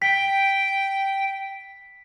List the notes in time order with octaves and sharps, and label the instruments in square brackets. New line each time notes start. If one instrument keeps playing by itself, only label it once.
[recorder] G5 [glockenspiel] B6